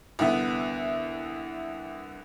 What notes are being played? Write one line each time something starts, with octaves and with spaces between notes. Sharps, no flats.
C2 D3 B3 E5